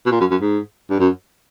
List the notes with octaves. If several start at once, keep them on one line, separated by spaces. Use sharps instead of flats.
B2
A#2
F#2
F#2
G#2
G2
F#2